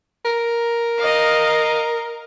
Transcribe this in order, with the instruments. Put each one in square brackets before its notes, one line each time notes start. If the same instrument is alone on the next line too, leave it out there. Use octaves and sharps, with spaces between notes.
[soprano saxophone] A#4
[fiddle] D#5 F5